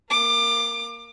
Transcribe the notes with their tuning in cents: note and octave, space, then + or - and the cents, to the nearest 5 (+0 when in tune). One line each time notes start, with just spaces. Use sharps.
A#3 +0 D6 +25